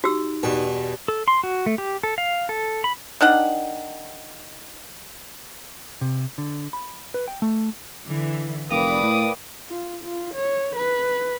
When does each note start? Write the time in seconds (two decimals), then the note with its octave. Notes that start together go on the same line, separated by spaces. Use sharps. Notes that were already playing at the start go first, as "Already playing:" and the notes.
0.04 D#4 F#4 G4 E6
0.43 E2 G2 B2 B4
1.08 A4
1.28 C6
1.44 F#4
1.66 A3
1.78 G4
2.03 A4
2.18 F5
2.49 A4
2.84 B5
3.21 D#3 D4 F#5
6.01 C3
6.38 D3
6.73 B5
7.14 B4
7.28 G5
7.42 A3
8.05 D3 E3
8.71 F1 A#4 B4 D5 F5 G5 D6 D#6
9.03 A2
9.68 F4
10.04 F4
10.34 C#5
10.76 B4